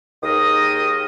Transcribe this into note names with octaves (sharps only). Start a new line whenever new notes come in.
D#2 D#3 G#4 A#4 D#5 D#6